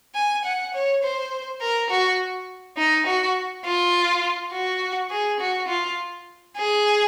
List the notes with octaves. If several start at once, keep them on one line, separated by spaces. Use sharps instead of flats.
G#5
F#5
C#5
C5
A#4
F#4
D#4
F#4
F4
F#4
G#4
F#4
F4
G#4